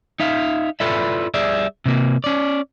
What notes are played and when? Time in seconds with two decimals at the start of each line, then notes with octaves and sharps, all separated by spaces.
0.20 D#4 E5 F5
0.80 E4 F4 A4 B4 D5 E5
1.34 G3 G#4 D5 E5
1.86 C3 A#3
2.24 C#4 D5